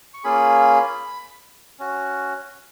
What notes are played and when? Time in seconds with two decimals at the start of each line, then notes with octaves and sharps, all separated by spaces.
0.14 C#6
0.24 A#3 C#4 F4 G#4 B5
1.79 C#4 F#4